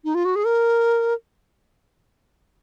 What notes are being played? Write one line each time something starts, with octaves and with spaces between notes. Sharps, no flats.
D#4
F4
F#4
G#4
A#4